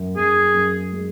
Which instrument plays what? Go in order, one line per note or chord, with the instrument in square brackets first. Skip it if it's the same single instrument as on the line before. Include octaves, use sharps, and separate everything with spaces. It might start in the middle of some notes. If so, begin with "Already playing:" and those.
Already playing: [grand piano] F#2
[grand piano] F#2 [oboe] G#4
[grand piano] F#2
G#3